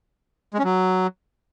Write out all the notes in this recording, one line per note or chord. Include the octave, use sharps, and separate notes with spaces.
G#3
C#4
F#3